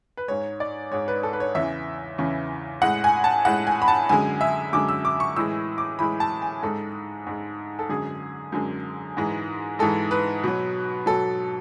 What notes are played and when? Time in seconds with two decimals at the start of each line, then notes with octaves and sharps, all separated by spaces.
0.17 B4
0.28 G#2 G#3 C#5
0.60 D5
0.91 G#2 G#3 C#5
1.08 B4
1.23 A4
1.33 B4
1.40 C#5
1.55 E2 C#3 E3 E5
2.18 E2 C#3 E3
2.82 A2 G#3 F#5
3.04 G#5
3.24 A5
3.45 A2 G#3 F#5
3.67 G#5
3.82 B5
3.88 A5
4.09 F#2 D3 G#3 G#5
4.41 E5
4.73 F#2 D3 G#3 D6
4.89 E6
5.05 D6
5.20 C#6
5.36 A2 E3 G#3 E6
5.78 D6
5.99 A2 E3 G#3 B5
6.20 A5
6.42 G#5
6.63 G#2 G#3 A4
7.27 G#2 G#3
7.79 A4
7.89 F#2 D3 G#3 G#4
8.52 F#2 D3 G#3
9.17 G#2 E3 G#3
9.79 G#2 E3 G#3 A4
10.11 B4
10.44 B2 F#3
11.06 B2 F#3 A4